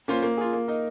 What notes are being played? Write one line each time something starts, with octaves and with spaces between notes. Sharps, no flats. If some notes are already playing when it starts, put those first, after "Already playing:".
A#3 C#4 F4 C5
A#3
F4 G#4
A#3
D#4 A#4 D#5